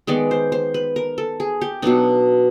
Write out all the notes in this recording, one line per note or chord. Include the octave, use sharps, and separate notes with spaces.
D#3 G#3 B3 D5
C5
C5
B4
A#4
A4
G#4
G4
B2 F#3 B3 D4 D#4